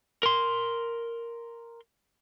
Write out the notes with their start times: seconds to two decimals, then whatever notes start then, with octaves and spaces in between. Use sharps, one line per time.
0.23 A#4 C6